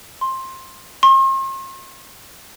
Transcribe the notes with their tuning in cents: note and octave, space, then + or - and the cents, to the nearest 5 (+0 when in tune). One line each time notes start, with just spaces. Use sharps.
C6 +15
C6 +45